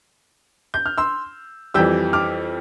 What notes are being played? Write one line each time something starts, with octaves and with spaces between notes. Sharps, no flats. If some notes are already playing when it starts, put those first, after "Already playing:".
G6
F6
C6 E6
F2 E3 G3 E6 G6
D6 F6